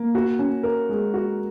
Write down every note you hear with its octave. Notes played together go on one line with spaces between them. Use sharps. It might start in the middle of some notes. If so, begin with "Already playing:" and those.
Already playing: A#3
F#4
C#4
A#4
G#3
F#4